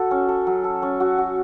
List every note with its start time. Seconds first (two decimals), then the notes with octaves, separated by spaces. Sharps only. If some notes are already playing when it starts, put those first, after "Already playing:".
Already playing: F#4 A4
0.11 C#4
0.29 A4
0.47 F#3
0.64 A4
0.82 C#4
1.00 F#4
1.18 F#4